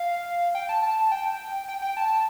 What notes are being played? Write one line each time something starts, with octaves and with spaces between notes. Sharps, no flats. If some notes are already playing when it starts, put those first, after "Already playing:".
Already playing: F5
G5
A5
A5
G5
G5
G5
A5